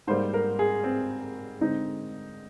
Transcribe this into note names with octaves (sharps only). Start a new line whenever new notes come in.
G#2 G3 A#3 C5
A#4
G#4
C4
D3 G#3 C4 D#4